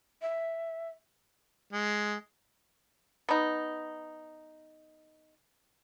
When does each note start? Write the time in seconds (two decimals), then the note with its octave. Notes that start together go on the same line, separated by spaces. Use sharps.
0.22 E5
1.73 G#3
3.29 B3 D#4